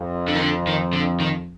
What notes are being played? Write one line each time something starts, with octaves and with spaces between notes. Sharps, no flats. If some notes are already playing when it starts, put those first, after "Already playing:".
Already playing: F2
D3
D#3
D3
D#3
D3
D#3